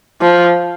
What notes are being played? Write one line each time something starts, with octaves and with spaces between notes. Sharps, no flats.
F3